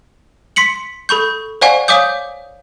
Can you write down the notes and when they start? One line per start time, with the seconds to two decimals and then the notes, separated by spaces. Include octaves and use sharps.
0.56 C6 B6 C#7 F#7
1.09 A4 B5 C#6 G6
1.61 C5 D5 F5 F#5 G#5 C#6
1.88 C#5 F5 G#5 D6 D#6 G6